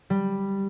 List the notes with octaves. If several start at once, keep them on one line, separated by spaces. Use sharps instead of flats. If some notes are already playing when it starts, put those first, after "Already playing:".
G3